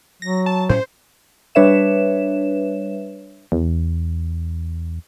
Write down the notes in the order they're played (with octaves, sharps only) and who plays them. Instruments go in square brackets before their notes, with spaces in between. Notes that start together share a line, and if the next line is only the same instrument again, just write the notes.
[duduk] F#3 [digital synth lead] A#6
[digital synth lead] A5
[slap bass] A2 C4 C#4 [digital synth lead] C5
[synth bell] G3 D4 B4 C#5 E5 E7
[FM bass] E2